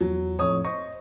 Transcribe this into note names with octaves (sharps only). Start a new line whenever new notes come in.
E2 F#3
F2 A2 C#5 D#6
C5 D#5 C#6